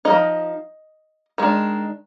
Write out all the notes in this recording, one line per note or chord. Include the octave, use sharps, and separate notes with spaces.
A#3 D#4 D#5
F3
D#3 G#3 D4